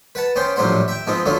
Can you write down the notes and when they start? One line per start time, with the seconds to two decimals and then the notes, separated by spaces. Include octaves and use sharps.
0.15 B4 F#5 A5
0.36 B3 C#4 C5 G5
0.56 A#1 A2 F#3 G3 C5 F#5
0.88 E5 G5
1.07 G#2 F3 B3 C4
1.26 D3 F#3 A3 B3 F4